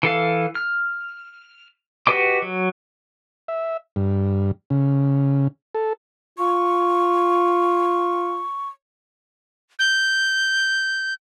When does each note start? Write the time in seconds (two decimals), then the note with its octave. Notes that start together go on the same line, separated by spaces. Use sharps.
0.03 E3 A4 F5
0.55 F6
2.07 F#4 G4 B4 D#5 D6
2.42 F#3
3.48 E5
3.96 G2
4.70 C#3
5.75 A4
6.38 F4 C#6
9.79 G6